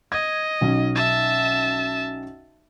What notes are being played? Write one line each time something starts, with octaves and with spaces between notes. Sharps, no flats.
D#5 G#6
B1 C#4 D#4
E5 A5